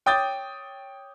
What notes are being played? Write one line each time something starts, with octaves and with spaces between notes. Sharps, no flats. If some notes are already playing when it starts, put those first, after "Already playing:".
C#5 G5 D6 D#6 G6 A6